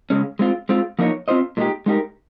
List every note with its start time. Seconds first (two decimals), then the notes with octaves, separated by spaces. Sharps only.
0.10 C#3 G#3 C#4
0.39 G#3 C4 F4
0.69 G#3 C4 F4
0.99 F3 A#3 D#4 A#4 C#5
1.28 C4 F4 C5 D#5
1.57 A#2 G#3 D#4 G4
1.86 G#3 D#4 G4 A#4